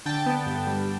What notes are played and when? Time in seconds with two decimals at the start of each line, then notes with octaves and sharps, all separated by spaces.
0.06 D3 G5 A5
0.26 B3
0.46 G2
0.67 G3